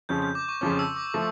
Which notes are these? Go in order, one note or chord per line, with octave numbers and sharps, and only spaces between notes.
F2 C#3 F3 C#4 G6
G6
D6
C#6
F2 C#3 F3 C#4 D6
E6
D6
F3 A3